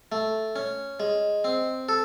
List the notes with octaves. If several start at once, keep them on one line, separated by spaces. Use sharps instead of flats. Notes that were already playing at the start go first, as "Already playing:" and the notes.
A3
C#4
G#3
C4
A4